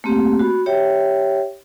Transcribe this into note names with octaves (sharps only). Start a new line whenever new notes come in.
A3 A#3 C4 G4
F#4 B5
G4 C#5 E5 G5